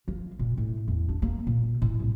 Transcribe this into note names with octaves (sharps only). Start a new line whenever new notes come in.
F3
A#2
A2
E2
D4
A#3
A#2
A2
C2